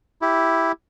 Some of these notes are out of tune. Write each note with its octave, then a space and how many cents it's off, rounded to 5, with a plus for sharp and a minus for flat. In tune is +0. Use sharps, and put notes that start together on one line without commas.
E4 +0 G4 +0